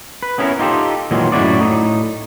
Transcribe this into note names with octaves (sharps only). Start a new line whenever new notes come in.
B4
B3 C#4 E4 G4 A#4
D#4 F4 G4 A4
A#2 D#3 E3 F#3 G#3
F#2 A2 C3 E4 F#4 D5
A2 D#4